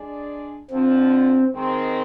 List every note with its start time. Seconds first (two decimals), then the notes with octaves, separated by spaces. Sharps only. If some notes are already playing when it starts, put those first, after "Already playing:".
Already playing: G#3 D4 G#4 D5
0.70 F2 D3 F3 C4
1.53 D#3 G#3 C4